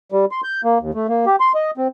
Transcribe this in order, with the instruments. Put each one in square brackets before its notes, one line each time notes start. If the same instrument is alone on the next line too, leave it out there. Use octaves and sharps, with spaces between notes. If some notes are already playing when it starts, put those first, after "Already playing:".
[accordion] G3
C6
G6
A#3
D#2
A3
A#3
G4
C6
D#5
C4